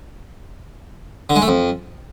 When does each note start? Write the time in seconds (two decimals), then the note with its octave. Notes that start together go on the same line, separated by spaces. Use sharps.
1.30 D3
1.36 G#3
1.42 A3
1.48 F2